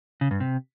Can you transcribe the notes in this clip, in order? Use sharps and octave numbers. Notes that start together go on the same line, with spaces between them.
C#3
G2
C3